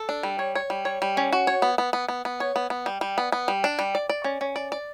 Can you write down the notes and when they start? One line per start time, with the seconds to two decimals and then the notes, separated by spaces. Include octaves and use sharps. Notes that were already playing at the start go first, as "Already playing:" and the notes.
Already playing: A4
0.09 D4
0.23 G3
0.39 C#5
0.55 C#5
0.70 G3
0.85 C#5
1.02 G3
1.17 C#4
1.32 F#4
1.47 C#5
1.62 B3
1.78 B3
1.93 B3
2.08 B3
2.25 B3
2.40 C#5
2.56 B3
2.70 B3
2.86 G3
3.01 G3
3.18 B3
3.32 B3
3.48 G3
3.64 D4
3.79 G3
3.95 D5
4.09 D5
4.24 C#4
4.41 C#4
4.56 D5
4.72 D5